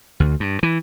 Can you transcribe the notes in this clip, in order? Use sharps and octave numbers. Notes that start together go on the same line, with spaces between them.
D2
G2
E3